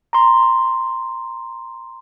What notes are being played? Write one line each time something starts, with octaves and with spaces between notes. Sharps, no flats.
A#5 C6